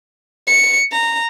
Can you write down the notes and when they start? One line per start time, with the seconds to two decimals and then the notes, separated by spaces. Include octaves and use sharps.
0.47 C#7
0.92 A#5